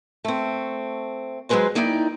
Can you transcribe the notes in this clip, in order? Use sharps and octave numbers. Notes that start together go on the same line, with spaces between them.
A3 C4
F#3 G#3 A3 G#4 B4 C5
A#3 D#4 E4 D5 G5